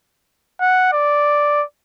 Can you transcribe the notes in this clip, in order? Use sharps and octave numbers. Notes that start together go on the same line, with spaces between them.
F#5
D5